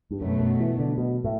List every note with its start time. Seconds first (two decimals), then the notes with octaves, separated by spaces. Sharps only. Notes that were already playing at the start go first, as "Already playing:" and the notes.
0.11 G2
0.21 F#2 B2 F#3 A3
0.40 F#2
0.60 E3
0.78 D3
0.98 B2
1.24 A2